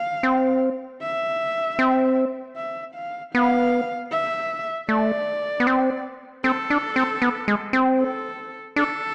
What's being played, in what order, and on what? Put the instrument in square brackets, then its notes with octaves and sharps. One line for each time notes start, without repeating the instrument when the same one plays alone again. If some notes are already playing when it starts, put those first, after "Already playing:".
Already playing: [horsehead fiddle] F5
[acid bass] C4
[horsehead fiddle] E5
[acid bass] C4
[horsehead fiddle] E5
F5
[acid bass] B3 [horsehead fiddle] F5
[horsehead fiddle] E5
[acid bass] A3 [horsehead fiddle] D5
[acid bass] B3
C4
[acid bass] C4 [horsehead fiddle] A4
[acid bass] D4
C4
B3
G#3
C4
[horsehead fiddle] A4
[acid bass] D4 [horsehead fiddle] A4